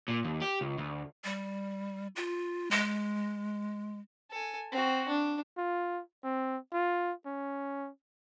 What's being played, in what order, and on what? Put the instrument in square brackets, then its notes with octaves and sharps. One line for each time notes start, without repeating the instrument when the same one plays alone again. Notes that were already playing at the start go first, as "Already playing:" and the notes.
[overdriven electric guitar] A#2
D#2
G4
C#2
D2
[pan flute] G3
F4
G#3
[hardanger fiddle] A4 G#5
C4 F#4
D4
[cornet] F4
C4
F4
C#4